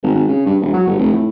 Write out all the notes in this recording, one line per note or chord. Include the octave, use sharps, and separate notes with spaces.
G#1
G#1
C#3
G2
E1
F#3
G1
F1
A2